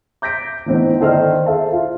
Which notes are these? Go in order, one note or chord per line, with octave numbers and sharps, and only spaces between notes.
D6 G6 A#6 B6 D7
E3 A3 B3 C4 D#4
D#3 A4 C5 D5 D#5 F6
G#4 A4 C5 E5 F5 A5
F4